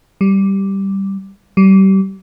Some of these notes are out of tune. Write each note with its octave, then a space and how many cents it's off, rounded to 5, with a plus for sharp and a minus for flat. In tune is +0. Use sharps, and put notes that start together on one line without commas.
G3 -5
G3 -30